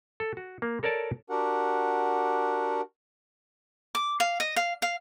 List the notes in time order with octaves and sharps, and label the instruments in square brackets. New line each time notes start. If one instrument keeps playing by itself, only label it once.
[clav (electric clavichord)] A4
F#4
A#3
A4 A#4 C#5 D5 A5
[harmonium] D4 F#4 G4 A#4 F#5
[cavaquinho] D6
F5
D#5
F5
F5